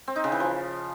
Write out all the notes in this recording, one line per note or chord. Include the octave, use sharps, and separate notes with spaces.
C4
D#4
C#3
E3
F3